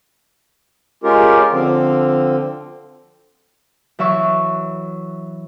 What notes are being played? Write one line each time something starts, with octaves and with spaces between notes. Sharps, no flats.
G#3 C#4 F4 G4 A#4
D3 F3 C4
E3 F#3 E5 C#6